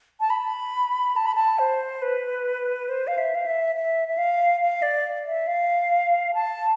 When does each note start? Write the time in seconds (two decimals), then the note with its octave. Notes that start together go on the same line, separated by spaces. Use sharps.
0.20 A5
0.30 B5
1.16 A5
1.26 B5
1.35 A5
1.59 C5
2.02 B4
2.89 C5
3.07 F5
3.18 E5
3.35 F5
3.46 E5
3.75 E5
4.08 E5
4.18 F5
4.61 F5
4.82 D5
5.26 E5
5.47 F5
6.34 A5